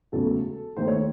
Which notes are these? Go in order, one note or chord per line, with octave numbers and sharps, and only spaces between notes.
E1 E2 C#3 F#3 A3 A4
D#2 D#3 A3 C5
C#5